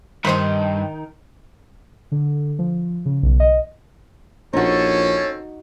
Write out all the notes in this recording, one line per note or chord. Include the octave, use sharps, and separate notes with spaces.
G2 D#3 D#4 C5 B5
D3
F3
C#3
B1
D#5
A#1 C4 C#4 D#4 F#4 A4 C#5